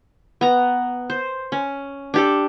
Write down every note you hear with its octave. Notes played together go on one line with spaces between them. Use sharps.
B3 A#5
C5
C#4
D4 G4 A4